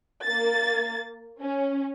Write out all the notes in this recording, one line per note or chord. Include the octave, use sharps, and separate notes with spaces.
A#3 A6
C#4